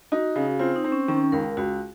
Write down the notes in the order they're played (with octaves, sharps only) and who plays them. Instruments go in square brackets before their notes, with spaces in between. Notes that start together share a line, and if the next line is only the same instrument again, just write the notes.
[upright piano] D#4 [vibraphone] F#4
[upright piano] C#3
[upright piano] C4 [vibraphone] F4
[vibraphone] D#4
[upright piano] C4
[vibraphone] C#4
[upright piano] D#3 [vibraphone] C#4
[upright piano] C#2 [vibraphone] A#4
[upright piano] C#2 [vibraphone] F#4